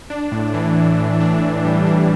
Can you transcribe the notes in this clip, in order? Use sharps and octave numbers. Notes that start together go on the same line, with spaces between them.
D4
A2
E3
A2
A2
D4
A2
G3
D4